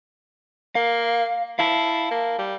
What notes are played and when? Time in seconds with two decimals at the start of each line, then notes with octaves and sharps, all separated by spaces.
0.75 A#3 F5
1.59 E4 F5 A5
2.11 A#3
2.38 G3